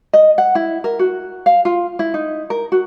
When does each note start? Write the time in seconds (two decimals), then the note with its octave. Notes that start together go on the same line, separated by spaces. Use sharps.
0.13 D#5
0.38 F#5
0.55 E4
0.84 A#4
0.99 F#4
1.46 F5
1.65 F4
1.99 E4
2.14 D#4
2.50 A#4
2.72 F#4